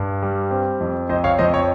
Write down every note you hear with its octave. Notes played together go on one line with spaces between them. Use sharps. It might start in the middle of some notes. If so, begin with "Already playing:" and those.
Already playing: G2
G3
C4
F2
F2 C5 D#5
C#5 F5
F2 C5 D#5
C#5